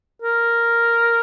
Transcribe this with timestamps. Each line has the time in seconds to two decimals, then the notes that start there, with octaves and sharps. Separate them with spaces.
0.22 A#4